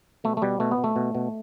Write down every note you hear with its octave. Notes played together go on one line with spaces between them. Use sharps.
B2 A3
A3
B2 G3
B2 A3
B3
B2
A3
B2
B2